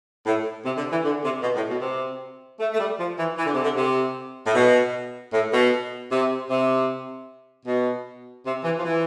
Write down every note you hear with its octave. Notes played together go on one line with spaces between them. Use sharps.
A2
C3
D3
E3
D3
C3
B2
A2
B2
C3
A3
A3
G3
F3
E3
E3
D3
C3
D3
C3
A2
B2
A2
B2
C3
C3
B2
C3
E3
F3
E3